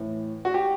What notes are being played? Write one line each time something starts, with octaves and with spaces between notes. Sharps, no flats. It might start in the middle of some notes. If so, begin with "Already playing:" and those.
Already playing: A2 E3
F#4
G4